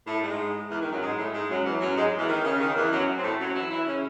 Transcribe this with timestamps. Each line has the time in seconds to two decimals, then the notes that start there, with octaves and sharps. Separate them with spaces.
0.07 A2 A3
0.23 G#2 G#3
0.70 E2 E3
0.81 D#3
0.91 F#2 F#3
1.02 G#2 G#3
1.18 A2 A3
1.34 G#2 G#3
1.49 F#2 F#3
1.65 E2 E3
1.81 F#2 F#3
1.96 G#2 G#3
2.18 E2 E3
2.28 D#3
2.45 C#3
2.60 D#3
2.76 E2 E3
2.91 F#2 F#3
3.18 C4
3.23 A2 A3
3.39 F#2 F#3
3.55 E3 E4
3.70 E3 E4
3.86 C#3 C#4